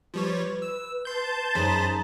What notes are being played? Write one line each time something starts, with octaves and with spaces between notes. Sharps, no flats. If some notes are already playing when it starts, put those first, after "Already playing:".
F3 G3 B4 C#5
E6
A5 C6 G6
F#2 D#4 G#4 C5 B5